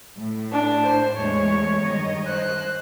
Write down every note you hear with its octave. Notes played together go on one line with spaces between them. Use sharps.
A2
D4
C5
E2 G#3 A3 C#5
G2 D#3 D#5
C5 F#6